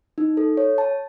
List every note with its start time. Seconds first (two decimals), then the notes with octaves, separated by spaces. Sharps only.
0.18 D#4
0.37 A4
0.57 C#5
0.78 A5